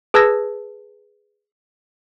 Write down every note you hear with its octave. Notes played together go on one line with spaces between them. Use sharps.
G#4 B4 A5 E6 G#6 A#6